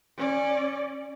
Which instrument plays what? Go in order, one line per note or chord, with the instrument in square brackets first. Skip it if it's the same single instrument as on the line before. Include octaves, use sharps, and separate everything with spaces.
[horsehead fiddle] C#4 D5